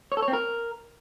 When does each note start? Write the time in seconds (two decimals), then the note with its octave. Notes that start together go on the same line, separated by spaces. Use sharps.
0.12 C#5
0.17 A4
0.22 C#5
0.28 C4
0.33 A#4